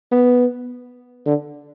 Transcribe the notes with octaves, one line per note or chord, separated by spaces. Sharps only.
B3
D3